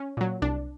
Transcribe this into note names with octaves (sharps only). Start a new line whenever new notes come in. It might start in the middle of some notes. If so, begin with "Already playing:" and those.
Already playing: C#4
A#2 F#3
C2 D4